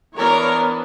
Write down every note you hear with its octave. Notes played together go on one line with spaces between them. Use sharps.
E3 B3 D4 A#4 C#5